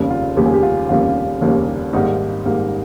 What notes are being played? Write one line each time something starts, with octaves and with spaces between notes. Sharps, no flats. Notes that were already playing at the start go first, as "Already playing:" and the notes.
Already playing: F1 D#2 C#3 G3 A#3
F4
F1 D#2 C#3 G3 A#3 G4
G#4
G4
F4
F1 D#2 C#3 G3 A#3 F4
F1 D#2 C#3 G3 A#3
G#1 G#2 G3 A#3 D#4
G#1 G#2 G3 A#3